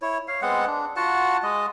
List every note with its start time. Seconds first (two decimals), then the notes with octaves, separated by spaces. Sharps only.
0.02 E4 C#5
0.28 C#5 F5
0.42 G#3 B3 C4 F#5
0.67 D4
0.96 F4 F#4 F#5 A5
1.43 G#3 D#5